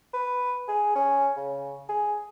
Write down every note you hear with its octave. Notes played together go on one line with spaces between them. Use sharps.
B4
G#4
C#4
C#3
G#4